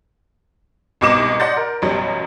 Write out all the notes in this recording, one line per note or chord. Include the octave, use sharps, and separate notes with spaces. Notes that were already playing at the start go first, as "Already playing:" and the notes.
C2 G#2 B2 D#5 D6 E7
D5 D#5 F#5 C6 G6 A6
A#4
A1 F#2 B2 F#3 G3